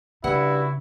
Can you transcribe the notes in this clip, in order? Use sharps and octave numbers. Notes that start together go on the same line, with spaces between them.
G2 C#3 E4 F#4